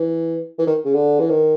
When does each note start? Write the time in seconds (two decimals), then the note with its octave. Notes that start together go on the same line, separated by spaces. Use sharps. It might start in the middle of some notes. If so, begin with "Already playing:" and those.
Already playing: E3
0.59 E3
0.67 D#3
0.85 C#3
0.94 D3
1.20 E3
1.30 D#3